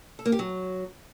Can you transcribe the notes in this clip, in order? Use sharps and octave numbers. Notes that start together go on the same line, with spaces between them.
A4
A#3
G4
F#3